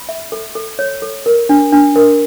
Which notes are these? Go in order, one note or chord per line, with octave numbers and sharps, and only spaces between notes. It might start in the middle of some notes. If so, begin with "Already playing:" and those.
Already playing: B5
E5
A4
A4
C#5
A4
A#4
D4
D4
A#4